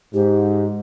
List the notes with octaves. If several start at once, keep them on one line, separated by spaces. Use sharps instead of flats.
G#2 G4